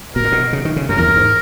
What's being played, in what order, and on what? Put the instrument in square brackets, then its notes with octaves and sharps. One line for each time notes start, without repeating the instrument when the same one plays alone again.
[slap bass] B2 [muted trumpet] A#4
[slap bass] A#2
B2
C#3
D#3
C#3
[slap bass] F#2 [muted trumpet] A#4
[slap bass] E2
F#2
G#2